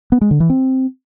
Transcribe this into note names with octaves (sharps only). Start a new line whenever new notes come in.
B3
G#3
D3
E3
C4